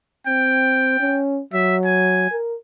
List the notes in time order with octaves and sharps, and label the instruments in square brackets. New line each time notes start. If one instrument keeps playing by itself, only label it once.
[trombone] C4 [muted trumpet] G5
[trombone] C#4
[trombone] F#3 [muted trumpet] E5
[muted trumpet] G#5
[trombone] A#4